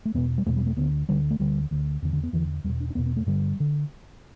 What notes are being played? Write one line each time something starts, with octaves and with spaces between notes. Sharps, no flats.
A3
E2 B2 B3
G3
E2 B2 A3
G3
A3
D2 D3 B3
D2 D3 G3
A3
D2 D3 G3
D2 D3
E2 D3
D3
B3
E2 D3 E3
E2 B2 G3
D4
D4
E2 B2 B3
B3
A3
G2 D3 G3
D3